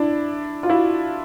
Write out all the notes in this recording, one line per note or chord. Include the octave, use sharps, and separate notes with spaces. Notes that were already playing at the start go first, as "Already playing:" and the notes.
Already playing: D4 E4
F4
E4 F#4